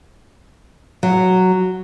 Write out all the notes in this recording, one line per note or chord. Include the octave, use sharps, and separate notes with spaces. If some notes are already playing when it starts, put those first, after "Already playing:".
F#3